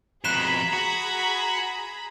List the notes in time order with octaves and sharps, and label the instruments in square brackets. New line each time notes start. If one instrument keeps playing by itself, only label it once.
[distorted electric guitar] F2 B2 [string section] G#4 A#5 B5 [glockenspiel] F#6 B6 E7
[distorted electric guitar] F#4